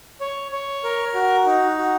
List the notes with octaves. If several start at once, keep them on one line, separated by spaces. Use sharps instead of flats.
C#5
C#5
A#4
F#4
D#4
F#4